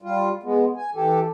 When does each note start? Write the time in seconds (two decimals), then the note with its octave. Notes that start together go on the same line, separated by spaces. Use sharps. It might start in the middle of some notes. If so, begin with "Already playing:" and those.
0.02 G3 F4
0.43 G#3 B3
0.77 G#5
0.95 E3 G4 A4